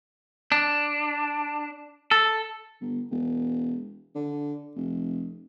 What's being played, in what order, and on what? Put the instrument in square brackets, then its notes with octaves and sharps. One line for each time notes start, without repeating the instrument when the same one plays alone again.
[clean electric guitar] D4
A4
[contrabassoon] G1
E1
D3
F1